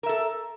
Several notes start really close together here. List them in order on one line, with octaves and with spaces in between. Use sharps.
A#4 E5 A4